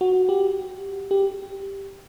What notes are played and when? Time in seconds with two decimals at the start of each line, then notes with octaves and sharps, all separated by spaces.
0.01 F#4
0.29 G4
1.11 G4